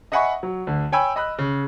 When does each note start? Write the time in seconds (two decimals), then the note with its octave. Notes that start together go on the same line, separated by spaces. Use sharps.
0.12 D#5 E5 F#5 G#5 B5 C#6
0.43 F#3
0.67 D2 D3
0.92 C#5 G5 G#5 B5 E6
1.16 D#5 B5 F#6
1.39 C#3